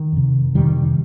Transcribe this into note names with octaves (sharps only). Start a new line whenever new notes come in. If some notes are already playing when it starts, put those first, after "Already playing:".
Already playing: D#3
F2 C3
F2 C3 D#3 G3